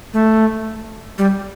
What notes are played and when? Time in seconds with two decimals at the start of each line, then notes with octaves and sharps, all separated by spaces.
0.13 A3
1.18 G3